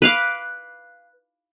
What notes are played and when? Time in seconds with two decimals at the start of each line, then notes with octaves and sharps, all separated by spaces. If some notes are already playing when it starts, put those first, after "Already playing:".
0.02 B4 F5 D6